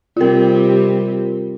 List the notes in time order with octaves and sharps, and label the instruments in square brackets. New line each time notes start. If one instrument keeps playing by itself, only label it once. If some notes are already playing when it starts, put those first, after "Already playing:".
[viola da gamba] C3 G3 C4 [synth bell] F4 A#4